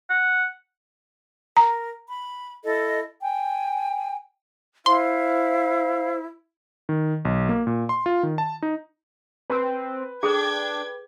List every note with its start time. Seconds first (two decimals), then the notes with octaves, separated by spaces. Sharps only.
0.10 F#5
1.57 A#4 A#5
2.09 B5
2.65 E4 A4 D#5
3.22 G5 G#5
4.86 E4 C5 F5 C6
6.89 D#3
7.25 B1
7.49 A#3
7.67 A#2
7.89 C6
8.06 F4
8.23 D#3
8.38 A5
8.62 D#4
9.50 C4 B4
10.23 D4 G#4 A4 G5 D6 G#6